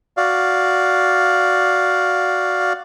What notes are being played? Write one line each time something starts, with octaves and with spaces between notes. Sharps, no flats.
F#4 D5 F5